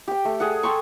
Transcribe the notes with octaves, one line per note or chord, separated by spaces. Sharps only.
G4 G5
A3
G#4 D5 F#5
A4 G5 C6 C#6